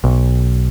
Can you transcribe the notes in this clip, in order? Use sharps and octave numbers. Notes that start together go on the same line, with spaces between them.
B1